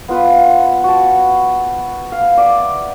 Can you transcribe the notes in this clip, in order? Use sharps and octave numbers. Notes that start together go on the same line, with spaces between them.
B3 F4 B4
F#4 A5
F5
D5 E5